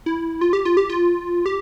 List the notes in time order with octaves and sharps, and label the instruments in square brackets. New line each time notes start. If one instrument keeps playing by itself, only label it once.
[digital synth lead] E4
F4
G4
F4
G4
F4
G4